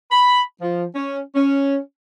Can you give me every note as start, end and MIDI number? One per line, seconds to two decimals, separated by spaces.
0.11 0.42 83
0.62 0.85 53
0.95 1.20 61
1.35 1.78 61